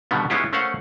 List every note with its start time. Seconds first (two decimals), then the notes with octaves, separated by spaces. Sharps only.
0.11 B2 D3 D#3 G3 B3
0.30 G#3 B3 C#4 E4 F4 G4
0.53 A3 C#4 A#4 C5 F5 F#5